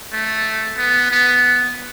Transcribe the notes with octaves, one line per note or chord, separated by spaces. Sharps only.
A3
B3
B3